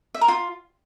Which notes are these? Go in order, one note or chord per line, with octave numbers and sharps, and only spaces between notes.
E5
A#4
F4